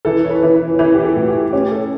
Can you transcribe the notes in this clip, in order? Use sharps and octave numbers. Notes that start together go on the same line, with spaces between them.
E3 A4
C#5
B4
E3
B4
C#5
E3 B4
G4
A4
A2
F#4
G4
C#4 G4
A4